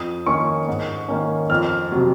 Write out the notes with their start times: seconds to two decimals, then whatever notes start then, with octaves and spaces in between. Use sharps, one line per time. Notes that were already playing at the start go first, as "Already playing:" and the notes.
Already playing: F2 D#6
0.26 D#3 A#3 C#4 C#6
0.68 G#2
1.08 D#3 A#3 C#4
1.50 F2 F6
1.92 C3 F#3